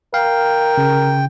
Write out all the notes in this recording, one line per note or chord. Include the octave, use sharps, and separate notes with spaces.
A#4 F5 G5
C#3